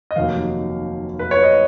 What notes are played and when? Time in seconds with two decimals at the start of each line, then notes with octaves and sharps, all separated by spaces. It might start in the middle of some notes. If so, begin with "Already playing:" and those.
0.11 D#5
0.16 F1 D#2 D#3 F#3 A#3 F5
1.19 B4
1.31 C#5
1.44 D#5